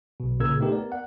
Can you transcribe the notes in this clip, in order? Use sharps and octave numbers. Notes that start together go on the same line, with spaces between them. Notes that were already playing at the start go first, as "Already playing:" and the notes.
B1 B2
C2 A#2 C#3 A#4 E6 G#6
A3 B3 D#4 G4 A#4
B3 A#4 D5
F#5